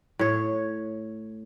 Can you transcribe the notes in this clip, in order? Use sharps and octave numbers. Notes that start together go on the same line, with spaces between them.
A2 C#5